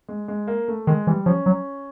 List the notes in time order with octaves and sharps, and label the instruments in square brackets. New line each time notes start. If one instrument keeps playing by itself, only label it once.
[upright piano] G#3
G#3
A#3
A3
[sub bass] D#3 [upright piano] G#3
[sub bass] E3 [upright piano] G3
[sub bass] F3 [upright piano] C#4
[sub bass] F#3